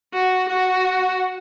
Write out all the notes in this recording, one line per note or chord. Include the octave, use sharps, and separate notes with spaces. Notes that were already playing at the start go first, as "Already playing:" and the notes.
F#4
F#4